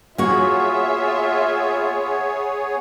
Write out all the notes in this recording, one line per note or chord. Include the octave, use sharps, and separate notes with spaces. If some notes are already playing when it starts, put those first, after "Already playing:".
A#3 B3 F4 F#4 G#4 C#5 E5